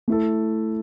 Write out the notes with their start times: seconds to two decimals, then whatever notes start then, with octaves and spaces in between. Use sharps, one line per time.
0.08 A3 E4 A4